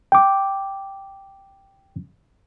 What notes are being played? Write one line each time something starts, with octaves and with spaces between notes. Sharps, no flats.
G5 D6